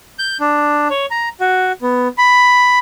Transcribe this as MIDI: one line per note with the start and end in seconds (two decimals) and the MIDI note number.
0.19 0.37 91
0.40 0.88 62
0.90 1.06 73
1.11 1.29 82
1.40 1.72 66
1.82 2.08 59
2.18 2.79 83